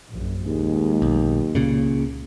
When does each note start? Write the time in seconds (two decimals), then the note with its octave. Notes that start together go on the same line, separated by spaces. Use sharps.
0.12 A#1 F#2
0.46 D#2 G#3
1.02 B1
1.55 C#2 A#2 C#3